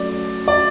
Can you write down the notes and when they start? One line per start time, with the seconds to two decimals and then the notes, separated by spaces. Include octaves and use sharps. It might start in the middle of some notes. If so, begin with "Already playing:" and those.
Already playing: F#3 A3 C#4 D5
0.48 D5